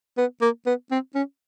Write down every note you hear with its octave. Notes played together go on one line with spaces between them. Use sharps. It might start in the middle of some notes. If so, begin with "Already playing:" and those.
B3
A#3
B3
C4
C#4